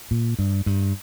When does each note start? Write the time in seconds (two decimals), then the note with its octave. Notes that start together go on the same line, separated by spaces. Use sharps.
0.11 A#2
0.39 G2
0.66 G2